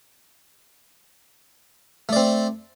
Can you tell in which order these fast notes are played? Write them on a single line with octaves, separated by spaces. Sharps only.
A3 D5 C4